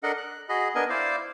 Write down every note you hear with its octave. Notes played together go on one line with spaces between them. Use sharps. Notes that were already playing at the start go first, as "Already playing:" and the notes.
D4 A4 A#4 D#5 F#5
F#6
F#4 G#4 D#5 B5
B3 D4 A#4 D#5 G#5
E4 C5 D5 F5